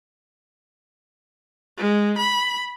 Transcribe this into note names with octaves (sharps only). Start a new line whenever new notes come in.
G#3
B5